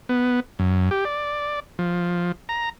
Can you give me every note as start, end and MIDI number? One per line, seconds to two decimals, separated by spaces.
0.09 0.40 59
0.59 0.90 42
0.91 1.04 67
1.05 1.60 74
1.79 2.32 53
2.49 2.69 82